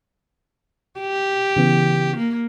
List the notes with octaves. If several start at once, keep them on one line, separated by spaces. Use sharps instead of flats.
G4
C#3 E3 B3
A#3